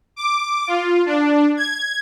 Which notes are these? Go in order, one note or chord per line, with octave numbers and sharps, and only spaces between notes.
D6
F4
D4
G#6